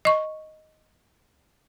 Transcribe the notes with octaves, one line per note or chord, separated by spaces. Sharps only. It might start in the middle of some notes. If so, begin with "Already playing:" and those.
D#5 C#6